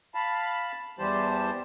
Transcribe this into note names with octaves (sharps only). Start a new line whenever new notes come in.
F5 A5 B5
E2 E3 G3 G4 C5 A5